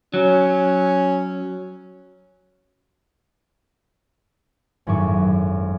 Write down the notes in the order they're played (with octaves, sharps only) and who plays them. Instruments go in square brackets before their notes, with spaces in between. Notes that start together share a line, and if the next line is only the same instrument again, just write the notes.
[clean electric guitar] F#3 [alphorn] C#4
[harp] G#1 F#2 A2 F#3 C#6 D6